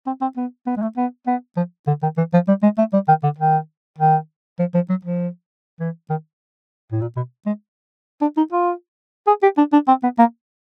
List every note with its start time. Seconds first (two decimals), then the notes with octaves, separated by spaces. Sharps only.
0.07 C4
0.21 C4
0.37 B3
0.67 B3
0.77 G#3
0.82 A3
0.97 B3
1.27 B3
1.57 F3
1.87 D3
2.03 D#3
2.17 E3
2.33 F3
2.48 G3
2.63 G#3
2.78 A3
2.93 G3
3.08 D#3
3.23 D3
3.39 D#3
3.98 D#3
4.59 F3
4.74 F3
4.89 F#3
5.05 F3
5.80 E3
6.10 D#3
6.92 A2
7.01 A#2
7.16 B2
7.46 G#3
8.21 D4
8.37 D#4
8.53 F4
9.27 G#4
9.43 G4
9.58 D4
9.73 D4
9.88 C4
10.03 B3
10.19 A#3